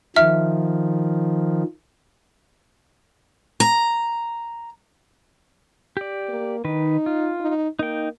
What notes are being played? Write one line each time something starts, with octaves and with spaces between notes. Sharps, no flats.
D#3 F3 E5 F6
A#5
G4 D5
A#3
D#3 D#4 B4
F4
D#4
A#3 D#4 G5